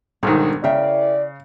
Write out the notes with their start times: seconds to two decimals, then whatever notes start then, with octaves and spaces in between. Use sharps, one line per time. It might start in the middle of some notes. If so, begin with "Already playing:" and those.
0.23 B1 G#2 D#3 G3 D4 A#4
0.64 C#3 E4 A#4 D5 E5 G5